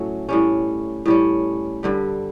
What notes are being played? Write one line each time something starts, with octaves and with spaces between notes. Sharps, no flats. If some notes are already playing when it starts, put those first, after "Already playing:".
Already playing: A2 F#3 A3 C#4
A2 G3 C#4
A2 G3 C#4
G2 D3 G3